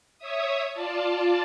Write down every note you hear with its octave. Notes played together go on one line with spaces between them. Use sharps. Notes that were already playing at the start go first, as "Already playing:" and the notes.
C#5 E5 D#6
F4 D5 A5